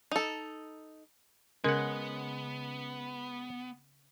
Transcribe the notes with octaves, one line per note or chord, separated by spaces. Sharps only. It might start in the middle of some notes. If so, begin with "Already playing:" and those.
D#4 A4
C#3 G#3 B3 C#4 A#4 F#5